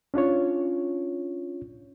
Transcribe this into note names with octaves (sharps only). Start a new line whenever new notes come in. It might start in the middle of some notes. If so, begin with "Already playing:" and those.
C#4 D4 F4 C#5